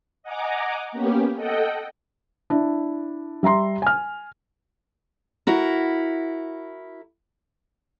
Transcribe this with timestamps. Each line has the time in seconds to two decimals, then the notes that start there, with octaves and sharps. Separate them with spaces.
0.23 D#5 F#5 G#5 A#5 D6
0.92 A#3 B3 C#4 G4
1.36 A4 D#5 F#5 G5
2.50 D4 E4
3.43 G3 E5 A#5 C6
3.82 G#5 F6
5.47 E4 F#4 A#4